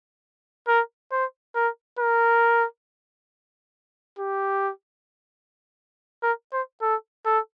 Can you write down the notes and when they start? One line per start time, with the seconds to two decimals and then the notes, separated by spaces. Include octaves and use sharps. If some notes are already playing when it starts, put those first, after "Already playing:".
0.67 A#4
1.12 C5
1.55 A#4
1.99 A#4
4.19 G4
6.23 A#4
6.53 C5
6.82 A4
7.26 A4